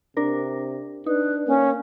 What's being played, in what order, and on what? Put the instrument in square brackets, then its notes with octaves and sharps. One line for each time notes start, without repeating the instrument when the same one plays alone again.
[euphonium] C3 [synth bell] D4 A#4
[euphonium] D4 [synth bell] D#4 [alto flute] B4
[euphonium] A#3 [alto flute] C#4